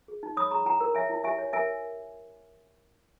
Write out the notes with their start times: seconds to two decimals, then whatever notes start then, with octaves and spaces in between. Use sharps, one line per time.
0.08 G#4
0.23 D#4
0.37 C#5 B5 D#6
0.51 G#4 A#5 C#6
0.66 E4 G5 A#5
0.81 A#4
0.95 C#5 E5 G#5
1.09 E4
1.24 G4 E5 G#5
1.38 C#5
1.53 A#4 E5 G#5